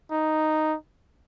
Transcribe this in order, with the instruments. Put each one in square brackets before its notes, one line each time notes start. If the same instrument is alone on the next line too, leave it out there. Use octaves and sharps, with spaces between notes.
[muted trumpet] D#4